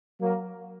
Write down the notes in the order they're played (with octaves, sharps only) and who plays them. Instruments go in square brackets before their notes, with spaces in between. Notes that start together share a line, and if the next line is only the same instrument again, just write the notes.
[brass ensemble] F#3 A#3